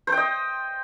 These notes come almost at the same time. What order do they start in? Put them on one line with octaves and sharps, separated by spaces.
C5 G5 D#5